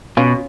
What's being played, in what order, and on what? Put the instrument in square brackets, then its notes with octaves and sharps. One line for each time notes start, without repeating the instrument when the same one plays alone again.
[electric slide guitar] B2 [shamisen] C#4 F4